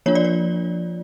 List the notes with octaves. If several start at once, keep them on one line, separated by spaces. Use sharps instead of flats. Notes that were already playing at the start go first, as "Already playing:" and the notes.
F3 A#3 D4 F4 C#5
D5
C#5